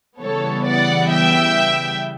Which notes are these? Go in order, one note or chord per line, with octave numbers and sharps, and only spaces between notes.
C#3 E3 G3 B3 A4 C#5
D5 F#5
E5 G5